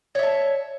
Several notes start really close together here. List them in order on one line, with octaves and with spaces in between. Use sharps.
C#5 E5 A5